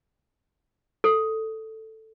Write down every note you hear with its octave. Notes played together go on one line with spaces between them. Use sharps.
A4